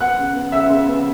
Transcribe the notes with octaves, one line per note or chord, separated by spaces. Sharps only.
B3 F#5 F#6
C#3
B3
C#3 E5 E6
C#3
B3